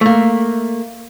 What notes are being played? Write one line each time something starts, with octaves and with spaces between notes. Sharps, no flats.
A3 A#3